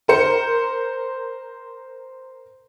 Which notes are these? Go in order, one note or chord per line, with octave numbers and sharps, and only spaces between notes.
A#4 C5 C#7